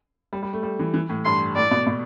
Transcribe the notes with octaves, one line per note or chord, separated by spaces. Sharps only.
G3
G3
A3
G3
E3
E3
A2
G2 C6
A2 D5
B2
B2